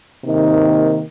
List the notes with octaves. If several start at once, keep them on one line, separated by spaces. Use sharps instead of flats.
C3 D#3 A#3 D#4